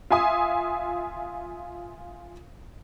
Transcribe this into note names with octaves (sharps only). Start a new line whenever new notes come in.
F4 E5 G#5 D#6